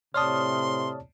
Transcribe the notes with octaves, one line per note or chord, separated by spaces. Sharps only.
A2 C3 C#5 D5 A5 C6 D#6 F6